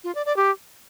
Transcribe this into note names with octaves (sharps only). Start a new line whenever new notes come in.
F4
D5
D5
G4